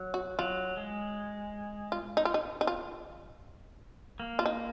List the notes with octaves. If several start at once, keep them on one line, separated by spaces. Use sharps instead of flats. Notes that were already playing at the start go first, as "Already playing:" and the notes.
Already playing: F#3
F#4
F#3 F4
G#3
F4
D#4
F4
D#4
D#4
F4
A#3
F4
D#4